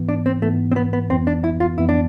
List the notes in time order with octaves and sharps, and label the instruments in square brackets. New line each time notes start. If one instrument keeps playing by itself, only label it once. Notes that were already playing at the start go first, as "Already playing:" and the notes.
Already playing: [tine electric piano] G#2 E3 B3
[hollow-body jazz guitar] D4
C4
[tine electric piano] G#2 E3 B3 [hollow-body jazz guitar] A3
[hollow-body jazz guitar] C4
B3
B3
[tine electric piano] F2 E3 B3 [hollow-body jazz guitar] C4
[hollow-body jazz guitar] D4
E4
F4
[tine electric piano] F2 E3 B3 [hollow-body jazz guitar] E4
[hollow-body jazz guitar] D4